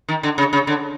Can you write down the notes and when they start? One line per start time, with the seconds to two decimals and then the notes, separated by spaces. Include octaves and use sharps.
0.08 D#3
0.23 D3
0.38 C#3
0.53 C#3
0.67 D3